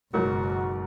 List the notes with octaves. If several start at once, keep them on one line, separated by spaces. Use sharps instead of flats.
F#1 G#2 B2 F#3 F#4 A#4 C#5